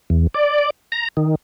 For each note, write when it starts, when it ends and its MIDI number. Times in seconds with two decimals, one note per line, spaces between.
0.10 0.27 40
0.34 0.70 74
0.92 1.08 82
1.17 1.35 51